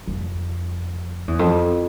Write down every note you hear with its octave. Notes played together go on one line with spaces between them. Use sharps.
F2
E2
F2